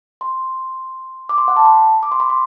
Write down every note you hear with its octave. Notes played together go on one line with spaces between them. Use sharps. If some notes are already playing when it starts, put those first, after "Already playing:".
C6
D6
C6
F#5
A5
B5
D6
C6
B5
C6